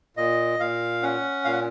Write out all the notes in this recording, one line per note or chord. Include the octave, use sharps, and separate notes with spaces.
A#2 D#5
A#2 F5
C#4 F#5
A#2 F5
F#5